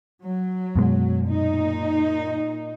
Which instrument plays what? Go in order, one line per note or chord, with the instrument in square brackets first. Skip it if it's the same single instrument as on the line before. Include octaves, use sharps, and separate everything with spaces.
[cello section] F#3
[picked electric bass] F#2 B2 G#3
[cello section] A#2 D#4